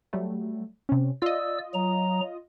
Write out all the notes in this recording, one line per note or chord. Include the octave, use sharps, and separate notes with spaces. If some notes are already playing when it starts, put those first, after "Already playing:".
F#3 G3 A3
C3 C#4
F4 D5 D#5 E6
F#3 A#5